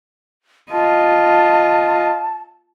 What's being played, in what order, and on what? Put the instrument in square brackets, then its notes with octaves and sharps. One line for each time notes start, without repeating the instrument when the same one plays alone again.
[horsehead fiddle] F4 D#5 [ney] A5